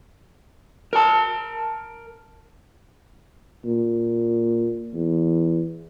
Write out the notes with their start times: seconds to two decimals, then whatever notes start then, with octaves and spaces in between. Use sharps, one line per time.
0.93 A#4 A5
3.65 A#2
4.94 E2